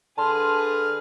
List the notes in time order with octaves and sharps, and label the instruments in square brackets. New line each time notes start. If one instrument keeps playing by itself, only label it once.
[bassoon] D3 [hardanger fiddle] G#4 B4 [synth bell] A5 C6 [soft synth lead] F6